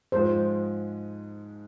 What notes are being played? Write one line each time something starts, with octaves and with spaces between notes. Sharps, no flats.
G#2 F3 G#3 C5